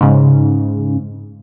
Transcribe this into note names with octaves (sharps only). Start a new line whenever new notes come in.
G#2 C#3